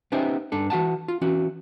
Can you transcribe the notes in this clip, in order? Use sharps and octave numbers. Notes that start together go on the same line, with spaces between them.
B3 C#4 D#4 G4 C5 E5
G2 D4 A4
E3 F#4 F#5 A5
F4
E3 C#4 F#4